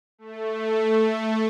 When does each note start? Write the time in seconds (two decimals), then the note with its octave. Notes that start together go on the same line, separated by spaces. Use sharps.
0.18 A3